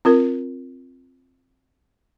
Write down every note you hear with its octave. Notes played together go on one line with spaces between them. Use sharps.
C4 F4 A#4